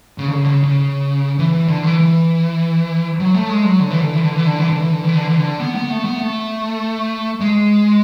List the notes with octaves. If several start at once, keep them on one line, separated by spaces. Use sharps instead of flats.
C#3
D3
C#3
D3
C#3
C#3
E3
E3
D3
E3
E3
F#3
A3
G#3
F#3
D3
E3
D3
E3
D3
E3
D3
E3
D3
E3
D3
E3
D3
E3
D3
B3
B3
A3
B3
A3
G#3